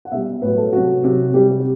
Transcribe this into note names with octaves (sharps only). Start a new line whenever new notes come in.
F#5
B2 G3 E5
A2 F#3 B4
A4
C3 F#3 F#4
C3 F#3
C3 G3 G4
G4